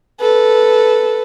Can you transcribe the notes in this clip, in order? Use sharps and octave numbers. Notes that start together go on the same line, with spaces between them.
A4 B4